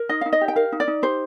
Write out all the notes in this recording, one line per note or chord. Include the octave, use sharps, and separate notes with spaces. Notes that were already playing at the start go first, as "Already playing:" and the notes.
Already playing: A#4
D#4 D#5
D#4 F5
D#5
G4
G5
A#4 F5
D#4
D5
D#4
G4 C5